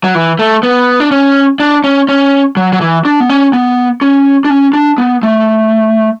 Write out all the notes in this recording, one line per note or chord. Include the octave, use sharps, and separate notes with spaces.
F#3
E3
A3
B3
D4
C#4
D4
C#4
C#4
F#3
F#3
E3
D4
B3
C#4
B3
C#4
D4
C#4
D4
B3
A3